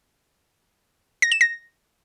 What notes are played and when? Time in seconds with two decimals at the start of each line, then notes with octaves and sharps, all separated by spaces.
1.22 A#6
1.32 E7
1.41 A#6